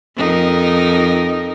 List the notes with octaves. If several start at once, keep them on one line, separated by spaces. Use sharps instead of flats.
F2 D#4 A#4